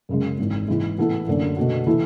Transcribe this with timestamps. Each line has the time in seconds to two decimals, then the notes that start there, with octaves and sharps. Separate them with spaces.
0.09 F#2 C#3 G#3
0.39 G#1 G#2 E3
0.68 G#2 E3 G#3
0.98 A2 E3 B3 E4 A4
1.27 F#1 F#2 D3 A3 D4
1.57 B2 A3 D4 F#4
1.87 E3 A3 E4